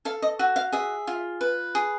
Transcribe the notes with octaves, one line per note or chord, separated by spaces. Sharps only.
A4 F5
D#5
F#4 E5
F5
G#4 E5
F4
B4
G#4